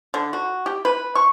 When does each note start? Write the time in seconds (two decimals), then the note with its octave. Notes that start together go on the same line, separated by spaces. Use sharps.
0.14 D3
0.33 F#4
0.66 G4
0.85 B4
1.15 C#6